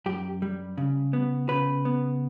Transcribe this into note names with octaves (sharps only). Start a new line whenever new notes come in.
F#2 G4
G3
C#3
B3
C#3 B4
B3